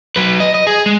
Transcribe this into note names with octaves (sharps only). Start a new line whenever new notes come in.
F#3 B4
D#5
D#5
G#4
G#3